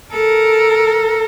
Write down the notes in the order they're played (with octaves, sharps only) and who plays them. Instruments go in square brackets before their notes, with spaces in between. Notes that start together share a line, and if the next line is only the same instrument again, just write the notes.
[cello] A4 A#4